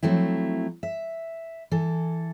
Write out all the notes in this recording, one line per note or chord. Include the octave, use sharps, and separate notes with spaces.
F3 F#3 A3 C4 E4
E5
E3 A4